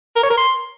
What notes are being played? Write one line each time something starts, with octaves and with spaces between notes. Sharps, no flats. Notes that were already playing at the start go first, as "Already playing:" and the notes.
A#4
C#5
A#4
C6